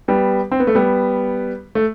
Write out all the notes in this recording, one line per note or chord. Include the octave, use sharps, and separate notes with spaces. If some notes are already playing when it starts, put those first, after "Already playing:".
G3 B3
C4
B3
A3
G3 B3
A3